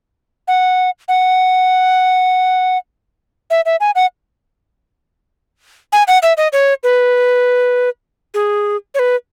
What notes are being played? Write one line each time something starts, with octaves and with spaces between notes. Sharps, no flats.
F#5
F#5
E5
E5
G#5
F#5
G#5
F#5
E5
D#5
C#5
B4
G#4
C#5
B4